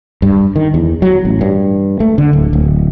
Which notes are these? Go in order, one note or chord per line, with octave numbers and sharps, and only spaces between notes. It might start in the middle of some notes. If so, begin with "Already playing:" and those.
G2
D#3
E2
F#3
A1
G2
A3
D3
D1
D1